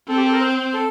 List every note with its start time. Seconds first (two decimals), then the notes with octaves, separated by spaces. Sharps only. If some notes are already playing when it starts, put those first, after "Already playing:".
0.08 C4 A4
0.17 G4
0.25 A4
0.32 A#4
0.41 C5
0.57 C5
0.73 A4